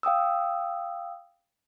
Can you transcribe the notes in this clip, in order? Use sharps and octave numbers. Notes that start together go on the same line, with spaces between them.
F5 G5 D#6 E6